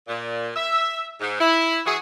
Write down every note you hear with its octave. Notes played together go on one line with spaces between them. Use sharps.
A#2
E5
G#2
E4
E3 F#4 G#4